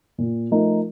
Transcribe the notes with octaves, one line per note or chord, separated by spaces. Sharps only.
A#2
F3 A3 D#4 A#4